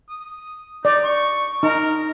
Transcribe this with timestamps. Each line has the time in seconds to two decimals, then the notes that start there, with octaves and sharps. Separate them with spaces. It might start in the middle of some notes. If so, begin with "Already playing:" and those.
0.09 D#6
0.85 D#4 D5
1.04 C#6
1.63 D#4 A#4